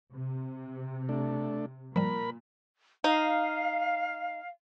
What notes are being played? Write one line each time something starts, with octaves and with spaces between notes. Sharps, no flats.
C3
A3 D4
A#2 F3 G3 A#4 B5
D#4 F5